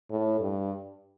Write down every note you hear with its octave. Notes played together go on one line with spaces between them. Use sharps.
A2
G2